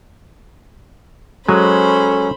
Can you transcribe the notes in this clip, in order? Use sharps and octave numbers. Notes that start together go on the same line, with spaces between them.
F#3 G#3 C#4 A4 C5 G#5 B5